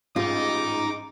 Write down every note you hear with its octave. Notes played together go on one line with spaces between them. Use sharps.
A1 G#2 G3 D#4 F4 D6